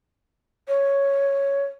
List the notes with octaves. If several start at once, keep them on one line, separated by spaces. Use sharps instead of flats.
C#5